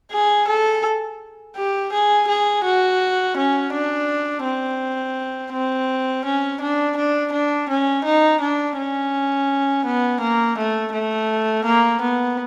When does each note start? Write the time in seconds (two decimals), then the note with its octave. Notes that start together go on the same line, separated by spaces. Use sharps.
0.12 G#4
0.48 A4
1.56 G4
1.93 G#4
2.28 G#4
2.65 F#4
3.37 C#4
3.73 D4
4.44 C4
5.53 C4
6.25 C#4
6.61 D4
6.97 D4
7.32 D4
7.69 C#4
8.05 D#4
8.41 D4
8.77 C#4
9.85 B3
10.21 A#3
10.58 A3
10.94 A3
11.65 A#3
12.01 B3